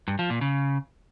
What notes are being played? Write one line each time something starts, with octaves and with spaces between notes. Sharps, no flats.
G2
F3
A#2
C#3